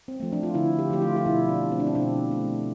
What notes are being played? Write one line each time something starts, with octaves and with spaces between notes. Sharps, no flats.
C4
F3 A3
D4
F4
D3 E4
G4
F3 A3 G4
F4
F4
B2 E4
D4
A3
C4
D4
C4
B2 D4
A3